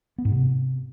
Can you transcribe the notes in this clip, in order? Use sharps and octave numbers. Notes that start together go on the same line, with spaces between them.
B3
G#2
C3